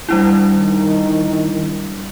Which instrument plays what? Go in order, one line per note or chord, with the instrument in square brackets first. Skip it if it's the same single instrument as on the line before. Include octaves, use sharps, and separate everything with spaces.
[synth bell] G3 D4 E4
[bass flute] D#3